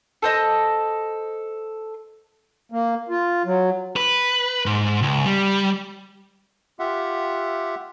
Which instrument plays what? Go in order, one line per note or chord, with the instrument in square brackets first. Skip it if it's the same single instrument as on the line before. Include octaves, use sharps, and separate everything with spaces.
[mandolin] A4 C5 D#5
[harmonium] A#3
F4
F#3
[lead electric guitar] B4
G#2
C#2
G3
[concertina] F4 G4 E5 F#5